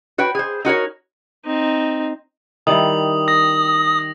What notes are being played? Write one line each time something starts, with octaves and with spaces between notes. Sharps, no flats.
F#4 B4 C#5 G5
G#4 C5
D#4 F#4 A#4 C#5
C4 D#4
D#3 G3 E4 D#6 F#7
D#6 A#6